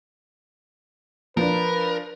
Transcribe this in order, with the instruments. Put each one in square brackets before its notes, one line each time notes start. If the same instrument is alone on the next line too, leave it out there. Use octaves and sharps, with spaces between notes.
[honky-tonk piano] F3 D4 [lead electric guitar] A#4 [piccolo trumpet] B4